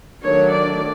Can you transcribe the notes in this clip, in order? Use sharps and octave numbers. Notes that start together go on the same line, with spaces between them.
D#3 F#3 A3 D4 C#5
D5